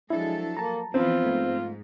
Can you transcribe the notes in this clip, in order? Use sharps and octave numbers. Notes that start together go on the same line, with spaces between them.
F3 F#3 G#3 D4 E4 A4
A#3 A5 A#5
E3 F3 B3 C4 F4
G#2 A3